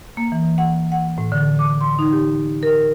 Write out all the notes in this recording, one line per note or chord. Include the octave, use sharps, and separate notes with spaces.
A#3
E3
F#5
F#5
A2
D3
D6
C6
D#4
G4
A#4